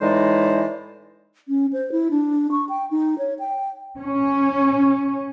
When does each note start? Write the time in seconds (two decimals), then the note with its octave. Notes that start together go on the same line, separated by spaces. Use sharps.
0.01 A2 E3 G#3 D#4 C5 D5
1.48 C#4
1.73 C5
1.92 E4
2.11 D4
2.51 C#6
2.69 G5
2.91 D#4
3.18 C#5
3.39 G5
3.99 C#4